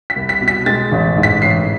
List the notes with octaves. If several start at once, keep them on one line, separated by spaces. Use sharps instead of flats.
B6
C2
B6
B2
B6
G#3 A6
A1
G#2
B6
A1 C7